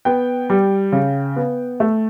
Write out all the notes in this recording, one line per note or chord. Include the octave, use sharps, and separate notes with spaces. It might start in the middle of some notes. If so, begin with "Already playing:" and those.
B3 G5
G3
C#3
B3
A3